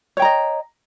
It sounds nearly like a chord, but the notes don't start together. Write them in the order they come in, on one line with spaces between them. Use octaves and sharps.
C#5 G5 A#5 D#5